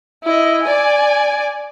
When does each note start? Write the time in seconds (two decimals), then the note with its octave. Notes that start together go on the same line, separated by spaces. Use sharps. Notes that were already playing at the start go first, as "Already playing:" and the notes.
0.24 E4 D#5
0.63 D5 G#5